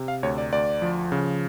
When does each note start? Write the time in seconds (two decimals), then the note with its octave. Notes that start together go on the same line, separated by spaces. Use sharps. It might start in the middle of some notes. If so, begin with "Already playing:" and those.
Already playing: C3
0.08 F5
0.23 D2 C#5
0.38 D5
0.52 D2 D5
0.82 F3
1.12 C#3